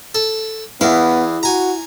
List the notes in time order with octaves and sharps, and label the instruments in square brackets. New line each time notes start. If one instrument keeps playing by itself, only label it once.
[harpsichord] A4
[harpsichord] E2 F5 [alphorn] B3 [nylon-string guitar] E4
[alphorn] F#4 [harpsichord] G#5 A#5